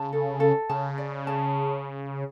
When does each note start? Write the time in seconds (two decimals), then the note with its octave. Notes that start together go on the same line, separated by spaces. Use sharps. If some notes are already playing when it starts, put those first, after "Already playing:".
Already playing: C#3 A5
0.13 A4
0.40 A4
0.69 C#3 A5
0.98 D5
1.27 A5